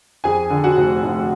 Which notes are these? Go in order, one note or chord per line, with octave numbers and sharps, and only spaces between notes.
F2 G#4 G#5
D3
F#4 F#5
F1
F1